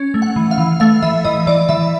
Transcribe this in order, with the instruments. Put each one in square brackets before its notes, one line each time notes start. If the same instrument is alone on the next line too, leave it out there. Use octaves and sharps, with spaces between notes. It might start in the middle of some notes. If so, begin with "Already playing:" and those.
Already playing: [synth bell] C#4
A3
F#5
E3
F5
E3
A3 F5
E3 E5
E3 D#5
E3 D5
E3 E5